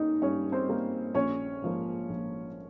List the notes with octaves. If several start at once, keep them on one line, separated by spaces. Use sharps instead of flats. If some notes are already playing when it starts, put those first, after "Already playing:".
Already playing: G2 G3 A#3 C#4 D#4 D#5
G2 C#4 C#5
C4 C5
G3 A#3
A#1 C#4 C#5
G#2 F3 A#3
A#1